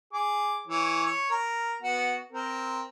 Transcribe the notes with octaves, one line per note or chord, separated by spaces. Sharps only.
G#4 D6
E3 C#5
C#5
A#4
B3 F#4
C4 A#4